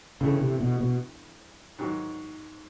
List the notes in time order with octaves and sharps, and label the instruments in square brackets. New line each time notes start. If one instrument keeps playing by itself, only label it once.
[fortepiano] G2 E3 A3 [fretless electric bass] C#3
[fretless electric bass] C3
B2
B2
[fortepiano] G#2 D#3 F#3